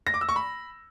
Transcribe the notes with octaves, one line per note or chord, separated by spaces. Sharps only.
A#6
D6
E6
C#6
B5